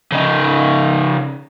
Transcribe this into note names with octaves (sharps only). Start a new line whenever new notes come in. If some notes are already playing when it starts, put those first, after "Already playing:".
C#3 D#4